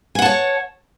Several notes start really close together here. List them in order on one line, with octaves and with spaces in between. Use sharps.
G#5 F#5 A5 C#5